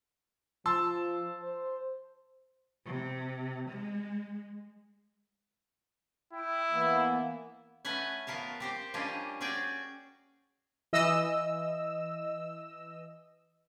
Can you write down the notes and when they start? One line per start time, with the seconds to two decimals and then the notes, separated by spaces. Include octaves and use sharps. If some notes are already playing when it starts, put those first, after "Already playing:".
0.66 F3 A5 C6 E6
1.42 C5
2.86 C3
3.69 G#3
6.33 E4 G5
6.72 E3 A#3 B3
7.85 A3 C#4 B4 F#5 G#5
8.27 F3 B3 A#4 F5 A5
8.60 C4 G4 C5
8.94 F3 G3 A#3 C#4 D4 D#5
9.41 C#4 F#4 G#4 D5 G5
10.93 E3 D#5 E6